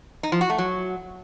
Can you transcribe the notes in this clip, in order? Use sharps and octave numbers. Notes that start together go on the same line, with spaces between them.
D#4
F3
F#4
A3
F#3